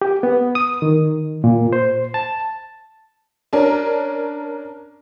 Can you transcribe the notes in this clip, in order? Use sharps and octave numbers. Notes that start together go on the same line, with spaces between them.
G4
B3
D#6
D#3
A#2
C5
A5
C#4 D4 A#4